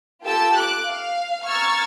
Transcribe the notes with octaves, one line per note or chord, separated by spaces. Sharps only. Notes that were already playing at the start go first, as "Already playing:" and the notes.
F4 G4 A4 G5 A5 E6
D6 F#6
F5
A#5 C#6 E6 F6 G#6 A6